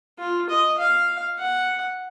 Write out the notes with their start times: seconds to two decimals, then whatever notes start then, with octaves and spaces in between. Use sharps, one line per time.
0.19 F4
0.50 D#5
0.78 F5
1.39 F#5